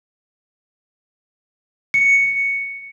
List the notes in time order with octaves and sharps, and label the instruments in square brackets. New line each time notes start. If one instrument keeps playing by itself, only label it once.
[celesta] C#7